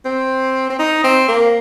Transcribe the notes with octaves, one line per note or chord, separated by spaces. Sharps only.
C4
C4
D#4
C4
A#3